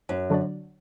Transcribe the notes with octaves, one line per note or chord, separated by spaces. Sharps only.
F#2
D3 F#3 D4 F#4 D5